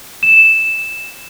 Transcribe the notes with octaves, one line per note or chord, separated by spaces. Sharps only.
E7